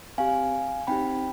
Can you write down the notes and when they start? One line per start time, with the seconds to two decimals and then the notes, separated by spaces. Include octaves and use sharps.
0.18 C4 G4 F5 G#5
0.87 C4 D#4 G4 G5 B5